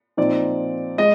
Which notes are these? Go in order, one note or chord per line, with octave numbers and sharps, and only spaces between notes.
A#2 F3 C4 D#4 D5
G#3 D#5